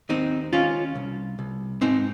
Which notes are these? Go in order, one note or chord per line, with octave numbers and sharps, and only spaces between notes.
D#2 C4 D#4
D#2 C#4 F4
C2
C2
G#2 C4 D#4